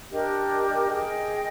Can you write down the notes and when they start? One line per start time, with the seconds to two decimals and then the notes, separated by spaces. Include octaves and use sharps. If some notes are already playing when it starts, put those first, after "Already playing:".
0.11 D4 G4 A#4 D#5
0.90 G#4 D#5 G5